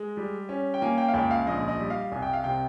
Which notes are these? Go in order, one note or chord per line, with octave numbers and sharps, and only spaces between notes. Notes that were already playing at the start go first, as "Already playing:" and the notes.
Already playing: G#3
G3
C#4
G5
A#3 G#5
G5
F5
C#2 G5
F5
A#1 D#5
D#5
G3
F5
C2 G#5
G5
F5
C3 G5